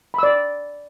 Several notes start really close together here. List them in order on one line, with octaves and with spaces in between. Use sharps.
B5 E6 D5